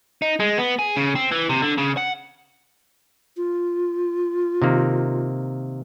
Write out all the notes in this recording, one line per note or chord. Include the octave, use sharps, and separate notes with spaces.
D#4
G#3
B3
G#4
C#3
C4
E3
C3
D3
C#3
F#5
F4
C3 D#3 A#3